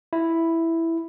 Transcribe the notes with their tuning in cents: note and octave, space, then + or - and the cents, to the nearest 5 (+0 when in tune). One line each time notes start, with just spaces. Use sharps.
E4 +0